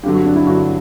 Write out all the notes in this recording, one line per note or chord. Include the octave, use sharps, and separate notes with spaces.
G2 D3 F#3 G4
F#4
D4
E4
G2 D3 F#3 F#4